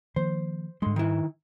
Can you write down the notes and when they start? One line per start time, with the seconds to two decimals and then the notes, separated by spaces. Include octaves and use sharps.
0.16 D#3 F3 A#3 C5
0.82 G#2 D3 G3 G#3 C6
0.96 D#3 E4